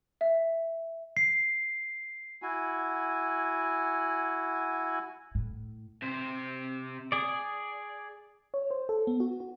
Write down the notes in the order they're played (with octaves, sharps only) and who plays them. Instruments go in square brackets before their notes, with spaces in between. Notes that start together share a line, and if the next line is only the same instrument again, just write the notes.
[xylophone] E5
[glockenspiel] C7
[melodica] E4 F#4 G#5
[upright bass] A2
[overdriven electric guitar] C3 C5
[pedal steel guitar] G#4 D5
[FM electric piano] C#5
C5
A4
B3
F#4
F#4